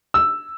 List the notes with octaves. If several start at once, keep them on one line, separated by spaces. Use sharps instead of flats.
E6